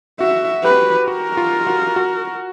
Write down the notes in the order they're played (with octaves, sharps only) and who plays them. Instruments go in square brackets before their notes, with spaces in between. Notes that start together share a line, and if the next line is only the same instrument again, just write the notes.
[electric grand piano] F#4 [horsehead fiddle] E5
[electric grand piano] G4 [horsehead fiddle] B4
[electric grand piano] F#4 [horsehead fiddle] A#4
[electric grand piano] F4
F#4
F#4